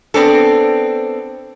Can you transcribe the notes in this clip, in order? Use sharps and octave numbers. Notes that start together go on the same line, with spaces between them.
B3 C4 D4 A4